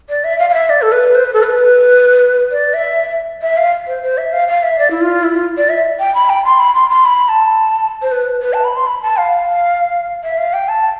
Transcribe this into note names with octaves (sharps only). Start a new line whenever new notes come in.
D5
E5
F5
F5
E5
D5
A4
B4
C5
B4
A4
B4
D5
E5
E5
F5
C5
C5
E5
F5
F5
E5
D5
E4
F4
E4
F4
D5
E5
G5
B5
G5
C6
B5
C6
C6
B5
A5
C5
B4
B4
A5
B5
C6
B5
A5
F5
E5
F5
G5
A5